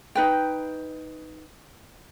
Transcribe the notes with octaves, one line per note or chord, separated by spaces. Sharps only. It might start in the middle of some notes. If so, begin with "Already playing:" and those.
D#4 B4 G5